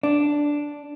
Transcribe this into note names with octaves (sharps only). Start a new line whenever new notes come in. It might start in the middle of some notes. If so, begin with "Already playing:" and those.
D4